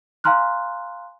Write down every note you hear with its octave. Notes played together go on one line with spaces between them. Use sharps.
F5 G#5 A#5 C6 F6 F#6